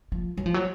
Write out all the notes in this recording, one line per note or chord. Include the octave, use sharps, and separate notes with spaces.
F3
F#3
F3
F#3